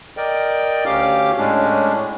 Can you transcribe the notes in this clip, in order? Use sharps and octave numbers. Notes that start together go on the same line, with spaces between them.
A#4 D5 D#5 G5
D2 C#4 G4 F5 D6
A2 G#3 C#4 D4